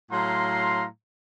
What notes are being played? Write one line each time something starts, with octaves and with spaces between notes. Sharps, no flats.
A2 F#3 F5 A#5 C6